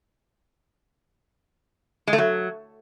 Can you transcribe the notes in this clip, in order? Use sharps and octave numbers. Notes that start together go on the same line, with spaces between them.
G#3
A3
F#3